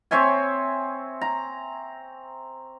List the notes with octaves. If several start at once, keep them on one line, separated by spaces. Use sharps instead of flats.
C4 C#5 E5 G#5
A#5